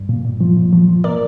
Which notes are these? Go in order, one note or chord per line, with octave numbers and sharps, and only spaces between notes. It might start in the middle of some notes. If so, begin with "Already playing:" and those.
Already playing: G2
A#2
A#2
F3
A#2
F3
F3
A#2 A#4 D5